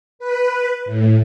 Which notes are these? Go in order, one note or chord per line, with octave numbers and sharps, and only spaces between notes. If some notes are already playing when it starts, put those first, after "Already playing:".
B4
A2